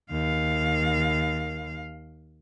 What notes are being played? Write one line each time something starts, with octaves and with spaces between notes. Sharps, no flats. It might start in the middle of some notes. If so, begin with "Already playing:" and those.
D#2 F5